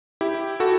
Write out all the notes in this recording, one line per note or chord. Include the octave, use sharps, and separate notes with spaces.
E4 G4
F#4 A4